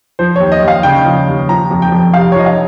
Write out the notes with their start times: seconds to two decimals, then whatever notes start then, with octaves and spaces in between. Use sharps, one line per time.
0.19 F3 C5
0.36 D#2 C#5
0.52 D#5
0.63 D#2 F5
0.83 C#3 G5
1.05 F3
1.28 D#2
1.49 F3 A#5
1.71 F2
1.82 G5
1.92 F2
2.14 C3 F5
2.32 C#5
2.35 F3 D#5
2.46 F5